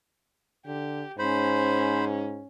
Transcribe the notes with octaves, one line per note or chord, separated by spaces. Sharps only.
D3 G4
G#2 C#4 C5 B5